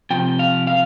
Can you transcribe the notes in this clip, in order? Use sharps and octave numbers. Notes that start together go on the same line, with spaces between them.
C3 F3 G5
F5
F5